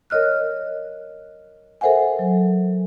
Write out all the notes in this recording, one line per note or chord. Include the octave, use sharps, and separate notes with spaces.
A#4 C#5 D#5 F6 F#6
A4 A#4 C5 E5 F#5 G#5
F#3